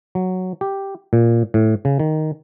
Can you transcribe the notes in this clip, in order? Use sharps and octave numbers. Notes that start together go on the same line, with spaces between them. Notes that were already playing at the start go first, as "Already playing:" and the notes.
F#3
G4
A#2
A2
C#3
D#3